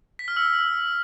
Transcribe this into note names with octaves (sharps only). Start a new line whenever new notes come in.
B6
F6
E6